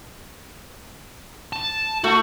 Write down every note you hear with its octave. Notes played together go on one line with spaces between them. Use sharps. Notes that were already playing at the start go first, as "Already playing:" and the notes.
A5
A3 F#4